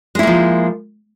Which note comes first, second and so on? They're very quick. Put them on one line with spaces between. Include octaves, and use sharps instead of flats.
G#3 E4 A#3 F3